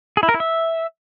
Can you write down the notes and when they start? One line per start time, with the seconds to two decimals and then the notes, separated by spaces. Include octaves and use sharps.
0.17 G#4
0.23 E4
0.29 A#4
0.34 E4
0.40 E5